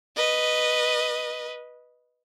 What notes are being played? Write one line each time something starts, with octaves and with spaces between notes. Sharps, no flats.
B4 D#5